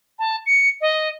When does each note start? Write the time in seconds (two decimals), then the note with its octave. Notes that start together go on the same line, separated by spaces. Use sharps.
0.19 A5
0.46 C#7
0.81 D#5